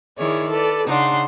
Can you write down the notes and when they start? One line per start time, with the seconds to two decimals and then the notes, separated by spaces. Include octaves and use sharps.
0.17 D#3 E4 G#4 C#5 D5
0.50 A4 B4 D5
0.86 C#3 D4 D#4 F#5 C6